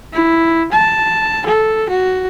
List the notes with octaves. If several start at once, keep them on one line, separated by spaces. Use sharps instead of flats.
E4
A5
A4
F#4